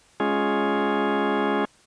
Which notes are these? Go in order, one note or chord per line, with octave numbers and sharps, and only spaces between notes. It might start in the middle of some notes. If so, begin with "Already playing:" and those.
G#3 C#4 F4 G#4